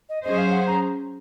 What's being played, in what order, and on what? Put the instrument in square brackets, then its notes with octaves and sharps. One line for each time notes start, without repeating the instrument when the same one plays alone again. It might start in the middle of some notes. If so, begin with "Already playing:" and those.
[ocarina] D#5
[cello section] F#3 C#4 G#4 C5 [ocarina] D#5
[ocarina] F5
F#5
A#5